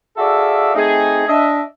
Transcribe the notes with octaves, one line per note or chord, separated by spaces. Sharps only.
F#4 G#4 A4 D5 E5 F5
A3 C4 D#4 G#4
D4 D#5 E5